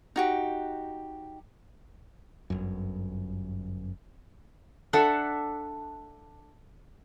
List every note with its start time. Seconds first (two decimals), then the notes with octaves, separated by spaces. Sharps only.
0.16 D#4 F#4 G4
2.50 G1 F#2
4.93 D4 A4 E5 F#5